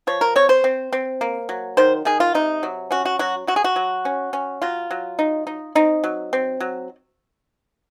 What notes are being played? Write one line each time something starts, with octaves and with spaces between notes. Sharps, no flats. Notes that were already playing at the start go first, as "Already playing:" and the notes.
F3 C#5
A#4
C4 C#5
C5
C4
C4
A#3
F#3
D#3 C5
D#3 G#4
F4
C3 D#4
F#3
C#4 F#4
F#4
F#3 F#4
F#3 F#4
G#4
F#4
F#3
C#4
C#4
F#3 F4
F#3
D#4
D#4
C4 D#4
F#3
C4
F#3